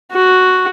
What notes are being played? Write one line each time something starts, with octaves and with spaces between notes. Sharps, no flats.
F#4